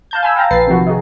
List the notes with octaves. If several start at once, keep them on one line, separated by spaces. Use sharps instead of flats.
F5 A5 G6
G#5 B5 E6
F5 G5 A5 A#5
A#1 B4 A6 C7
C3 D#3 F3 F#4
D#4 F#4 G#4